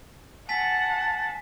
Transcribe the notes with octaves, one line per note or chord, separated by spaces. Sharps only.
F#5 G#5 A5 A6 B6